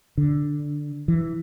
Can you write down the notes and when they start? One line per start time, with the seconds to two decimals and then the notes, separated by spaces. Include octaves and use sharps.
0.18 D3
1.08 E3